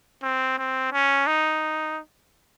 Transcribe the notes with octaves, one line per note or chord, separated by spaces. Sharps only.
C4
C4
C#4
D#4